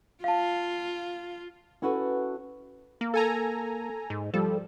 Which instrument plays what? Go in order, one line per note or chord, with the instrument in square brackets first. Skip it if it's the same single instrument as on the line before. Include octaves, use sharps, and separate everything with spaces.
[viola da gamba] F4 [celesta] F5 A5
[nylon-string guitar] C#4 E4 F#4 A4 B4
[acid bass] A#3
[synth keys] A4 G#5 A#5
[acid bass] G#2
[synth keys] F3 G3 [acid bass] A4